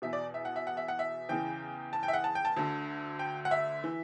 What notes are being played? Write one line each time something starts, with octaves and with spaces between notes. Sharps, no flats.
E2 B2 E5
D5
E5
F#5
E5
F#5
E5
F#5
E5
E2 C#3 E3 G5
A5
G5
E5
F#5
A5
G5
A5
D2 D3 A5
G5
F#5
E5
E3